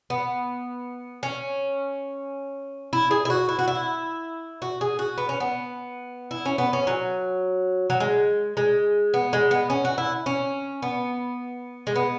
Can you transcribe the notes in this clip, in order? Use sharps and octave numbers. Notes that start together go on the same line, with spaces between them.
B3
C#4
E4
G#4
E4
F#4
E4
F#4
E4
F#4
G#4
F#4
B3
C#4
B3
E4
C#4
B3
C#4
F#3
F#3
G#3
G#3
B3
G#3
B3
C#4
F#4
E4
C#4
B3
G#3
B3